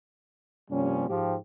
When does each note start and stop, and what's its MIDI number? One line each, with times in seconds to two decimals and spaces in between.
0.70 1.07 43
0.70 1.07 48
0.70 1.07 53
0.70 1.07 55
0.70 1.07 58
0.70 1.07 61
1.08 1.36 44
1.08 1.36 53
1.08 1.36 67